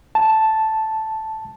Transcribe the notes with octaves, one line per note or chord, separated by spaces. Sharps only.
A5